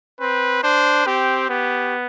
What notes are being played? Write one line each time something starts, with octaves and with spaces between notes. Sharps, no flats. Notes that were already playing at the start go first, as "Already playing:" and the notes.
C4 B4
D4 C5
C4 G4
B3 G4